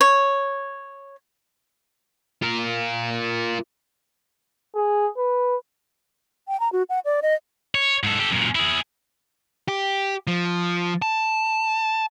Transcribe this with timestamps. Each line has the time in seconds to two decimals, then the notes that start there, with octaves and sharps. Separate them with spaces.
0.01 C#5
2.42 F4 A#4
4.75 G#4
5.18 B4
6.48 G5
6.60 A#5
6.72 F#4
6.89 F#5
7.05 D5
7.22 D#5
7.75 C#5
8.03 G#2 A4
8.19 G4 A4
8.32 F#2 A#2
8.55 E4 G#4
9.68 G4
10.27 F3
11.02 A5